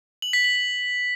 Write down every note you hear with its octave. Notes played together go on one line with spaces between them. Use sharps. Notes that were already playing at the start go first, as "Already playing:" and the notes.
F#7
B6
F#7
F#7